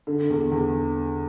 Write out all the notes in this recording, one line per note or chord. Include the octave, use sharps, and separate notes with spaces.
D3
E2
E2